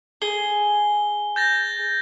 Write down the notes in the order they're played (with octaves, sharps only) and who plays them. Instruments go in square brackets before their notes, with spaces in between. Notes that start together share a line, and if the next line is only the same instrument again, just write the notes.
[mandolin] G#4 [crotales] G7
[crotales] G6 A6 A#6